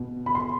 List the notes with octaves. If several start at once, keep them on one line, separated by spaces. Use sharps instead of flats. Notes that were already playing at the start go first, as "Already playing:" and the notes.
Already playing: B2
B5
C6